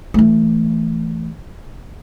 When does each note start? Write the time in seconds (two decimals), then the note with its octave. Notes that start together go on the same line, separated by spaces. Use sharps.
0.14 E3 A3